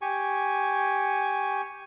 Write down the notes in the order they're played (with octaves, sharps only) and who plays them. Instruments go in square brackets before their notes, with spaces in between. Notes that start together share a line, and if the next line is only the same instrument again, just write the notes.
[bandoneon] G4 G#5 C#6